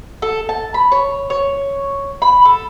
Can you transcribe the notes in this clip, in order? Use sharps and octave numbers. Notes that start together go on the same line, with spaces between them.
A4
A5
B5
C#5
C#5
B5
A4